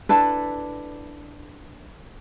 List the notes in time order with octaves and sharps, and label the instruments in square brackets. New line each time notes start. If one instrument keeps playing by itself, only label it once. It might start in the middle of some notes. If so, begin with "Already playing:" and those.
[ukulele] D4 E4 A4 B4